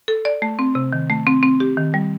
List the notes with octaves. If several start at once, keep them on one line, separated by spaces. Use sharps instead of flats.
A4
D5
A3
C4
C3
D#3
A3
C4
C4
G4
D#3
G3